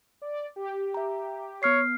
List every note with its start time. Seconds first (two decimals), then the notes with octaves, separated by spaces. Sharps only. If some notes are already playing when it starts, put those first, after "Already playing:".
0.22 D5
0.56 G4
0.94 E5 A#5
1.63 B3 C#5 F6 C7